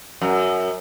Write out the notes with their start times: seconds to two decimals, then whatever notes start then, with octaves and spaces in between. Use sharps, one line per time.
0.22 F#2